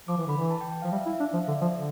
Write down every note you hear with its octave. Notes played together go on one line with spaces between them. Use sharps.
F3 D6
E3
D3 B5
E3
A5
G5
G5
F3 F5
G3 E5
E4
E5
D4
F3
F5
D3 E5
D5
F3
D3